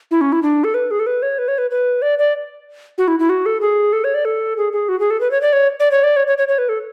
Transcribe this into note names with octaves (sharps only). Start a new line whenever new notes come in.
E4
C#4
E4
D4
A4
B4
G#4
A4
B4
C#5
B4
C#5
B4
B4
D5
D5
F#4
E4
E4
F#4
A4
G#4
A4
C#5
D5
A4
G#4
G#4
F#4
G#4
A4
B4
C#5
D5
C#5
D5
C#5
D5
C#5
C#5
C#5
C#5
B4
A4